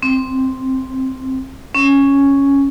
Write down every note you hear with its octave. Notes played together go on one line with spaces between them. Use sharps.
C4
C#4